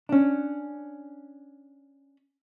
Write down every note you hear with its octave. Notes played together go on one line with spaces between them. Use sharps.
C#4 D4